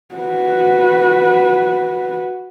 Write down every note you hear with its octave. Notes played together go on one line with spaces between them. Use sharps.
F#4 B4